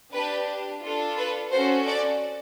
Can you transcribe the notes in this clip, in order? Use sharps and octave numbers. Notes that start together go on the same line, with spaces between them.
D4 G4 B4
D4 F4 A4
B4
C#4 F#4 A4 C5
D5